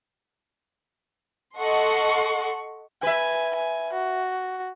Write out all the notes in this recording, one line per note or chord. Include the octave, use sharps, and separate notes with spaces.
A4 D#5 F#5 C6 C#6
B4 E5 G#5
G#5
F#4